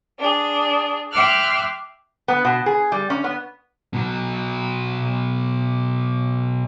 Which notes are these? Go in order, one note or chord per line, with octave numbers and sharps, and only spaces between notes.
D4 G#4
E5 G5 C6 D6 F6 F#6
B3
B2
G#4
G3
C#4
B3
B2 F#3